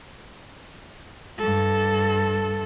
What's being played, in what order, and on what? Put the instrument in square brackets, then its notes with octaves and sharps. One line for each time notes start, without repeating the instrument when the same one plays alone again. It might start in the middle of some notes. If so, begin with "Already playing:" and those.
[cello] G2 A4